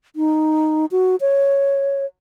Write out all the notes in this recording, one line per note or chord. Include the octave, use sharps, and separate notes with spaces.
D#4
F#4
C#5